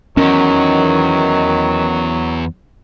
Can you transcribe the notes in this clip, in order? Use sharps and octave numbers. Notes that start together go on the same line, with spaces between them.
E2 D#3 F#3 C#4